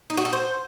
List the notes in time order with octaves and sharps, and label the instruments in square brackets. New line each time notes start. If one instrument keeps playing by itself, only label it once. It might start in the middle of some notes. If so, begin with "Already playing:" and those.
[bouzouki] D#4
F#4
A4
C5